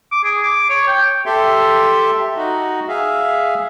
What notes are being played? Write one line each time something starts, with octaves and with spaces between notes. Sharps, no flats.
D6
G#4
D6
C#5
G5
G4 A4 E5 C6
D#4 F#4
G#4 E5 F5